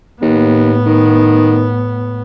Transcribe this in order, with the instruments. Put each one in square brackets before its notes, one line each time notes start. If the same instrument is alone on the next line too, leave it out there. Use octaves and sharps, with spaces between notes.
[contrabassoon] D#2 [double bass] A2 B3
[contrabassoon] D#3